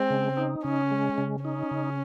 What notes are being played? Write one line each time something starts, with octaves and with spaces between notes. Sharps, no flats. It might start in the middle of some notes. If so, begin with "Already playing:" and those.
Already playing: G#3 C4
C#3
D#4
C#3 C#4
G#3
C#3
C#4 D#4
C#3